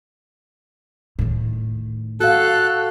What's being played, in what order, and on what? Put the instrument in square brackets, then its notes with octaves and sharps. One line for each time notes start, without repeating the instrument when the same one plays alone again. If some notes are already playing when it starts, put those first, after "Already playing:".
[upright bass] A2 D#3
[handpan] F#4 F5 [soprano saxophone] A4 [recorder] F#6